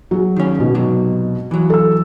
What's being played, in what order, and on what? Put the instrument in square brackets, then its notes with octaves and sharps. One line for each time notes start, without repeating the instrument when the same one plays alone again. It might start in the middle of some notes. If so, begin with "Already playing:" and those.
[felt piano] F#3 G#4
[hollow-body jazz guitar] D#3 C#4
[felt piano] G#2 B2
[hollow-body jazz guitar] C3 F#3
E3 F#3
[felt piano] A4 E6